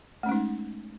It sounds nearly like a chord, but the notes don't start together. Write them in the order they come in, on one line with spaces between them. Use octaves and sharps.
A3 C#4 G#3 D#4